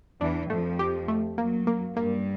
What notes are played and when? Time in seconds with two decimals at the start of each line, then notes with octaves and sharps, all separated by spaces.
0.21 E2 E3 D4
0.50 F2 F3 A3
0.79 G4
1.08 A3
1.38 F#2 F#3 A#3
1.67 A#3
1.96 G2 G3 A#3